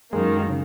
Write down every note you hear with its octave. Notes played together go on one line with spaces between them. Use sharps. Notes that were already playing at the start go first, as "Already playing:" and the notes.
F#2 D#3 G#3 A#3
C#3